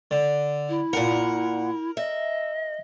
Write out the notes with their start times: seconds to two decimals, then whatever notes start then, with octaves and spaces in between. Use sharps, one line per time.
0.11 D3
0.69 E4
0.93 A#2 A#4 F#5
1.97 D#5 E5